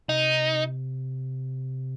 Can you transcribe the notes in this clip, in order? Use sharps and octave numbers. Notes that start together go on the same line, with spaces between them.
C3 D#4